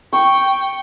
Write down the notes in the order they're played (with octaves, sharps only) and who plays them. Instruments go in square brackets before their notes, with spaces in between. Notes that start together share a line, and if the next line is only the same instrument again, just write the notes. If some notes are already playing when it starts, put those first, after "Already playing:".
[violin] G5 [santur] C#6